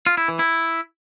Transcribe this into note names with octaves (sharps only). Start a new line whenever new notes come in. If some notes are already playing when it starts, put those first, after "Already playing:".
F4
E4
E3
E4